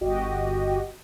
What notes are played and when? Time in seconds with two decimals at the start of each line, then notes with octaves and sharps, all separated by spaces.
0.01 G1 F#4 G4 D#5